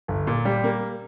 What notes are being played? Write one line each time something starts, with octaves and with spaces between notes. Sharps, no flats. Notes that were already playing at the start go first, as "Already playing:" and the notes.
G1
A#2
G3
A#3